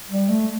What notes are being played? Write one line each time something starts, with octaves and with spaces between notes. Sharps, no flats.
G3
A3